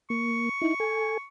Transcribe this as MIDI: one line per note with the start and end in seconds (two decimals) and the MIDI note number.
0.10 0.49 58
0.10 1.26 85
0.62 0.74 63
0.62 0.74 64
0.80 1.17 69
0.80 1.17 80